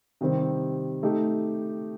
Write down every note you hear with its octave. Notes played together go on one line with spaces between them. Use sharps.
C3 D#3 G3 C4
A3 D#4 G4